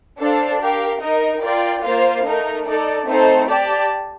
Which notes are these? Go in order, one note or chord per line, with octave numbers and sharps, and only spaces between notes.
D4 A4 C5 F5
G4 A#4 F5
D#4 A#4 D#5
F4 A#4 D5 G5
A#3 F4 C5 F5
A3 D#4 A#4
D#4 A4 D5
A3 C4 D#4 A4 C5
G4 D5 A5